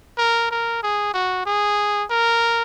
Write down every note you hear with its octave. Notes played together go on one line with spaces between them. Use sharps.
A#4
A#4
G#4
F#4
G#4
A#4